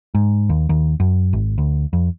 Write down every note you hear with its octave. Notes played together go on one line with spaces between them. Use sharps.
G#2
D#2
D#2
F#2
G#1
D2
F2